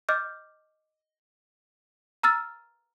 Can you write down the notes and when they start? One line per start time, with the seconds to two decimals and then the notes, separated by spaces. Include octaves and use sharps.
0.09 D#5 D6 F6 G6
2.23 A#5 E6 F6 A6